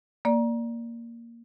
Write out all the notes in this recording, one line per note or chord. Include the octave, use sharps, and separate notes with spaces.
A#3 D5